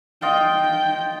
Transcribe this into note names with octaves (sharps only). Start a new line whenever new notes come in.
F4 D#5 G5